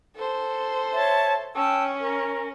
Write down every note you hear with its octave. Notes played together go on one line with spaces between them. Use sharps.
A4 C5
C#5 E5 A5
C#4 G5 A5 E6
A#4